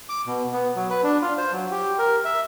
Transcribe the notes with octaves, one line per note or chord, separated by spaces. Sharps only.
D6
B2
B3
F#3
B4
D4
F4
C5
F#3
G4
A#4
E5